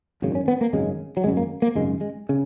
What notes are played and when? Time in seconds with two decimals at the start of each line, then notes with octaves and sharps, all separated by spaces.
0.22 G#1 F#2 C#3
0.35 C#4
0.48 B3
0.61 A#3
0.73 G#1 F#2 C#3 G#3
1.17 F#3
1.24 G#1 F#2 C#3 G#3
1.37 A#3
1.62 A#3
1.75 G#1 F#2 C#3 G#3
2.01 G#3
2.29 C#3